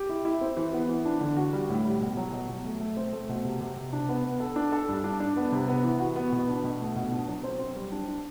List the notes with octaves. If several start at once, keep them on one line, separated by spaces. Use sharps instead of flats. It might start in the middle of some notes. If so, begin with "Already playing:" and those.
Already playing: G4
E4
E4
C4
E3
B3
E3
D4
D3
F#4
G3
A2
G3
B2
F#3
B2
B2
A3
A3
C4
A3
B2
C3
C3
C3
D4
B3
B3
A4
D4
A4
G2
D4
D4
B3
C3
B3
E3
F#4
B3
B2
D4
B2
A3
B2
D4
F#3
C4
C4
G3
D4
D4